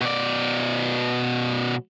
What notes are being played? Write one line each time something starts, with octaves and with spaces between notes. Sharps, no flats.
B2 D5